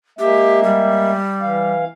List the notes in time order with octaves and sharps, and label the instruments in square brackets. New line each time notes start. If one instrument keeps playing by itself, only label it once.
[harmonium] G#3 A#3 E5 [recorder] G4
[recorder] G3
[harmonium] E3 F5